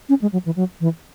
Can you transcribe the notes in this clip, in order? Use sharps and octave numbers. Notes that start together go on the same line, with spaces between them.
C#4
G#3
F#3
E3
F#3
E3